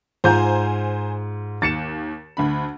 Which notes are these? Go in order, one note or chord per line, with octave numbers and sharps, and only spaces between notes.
G#2 F4 C5 G#5 A#5 G6
D#2 A6 C#7 E7
D2 D3 B5